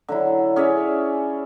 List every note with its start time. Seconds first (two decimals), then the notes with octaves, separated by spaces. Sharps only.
0.08 D3 F#3 E4
0.56 C#4 G#4 D5 E5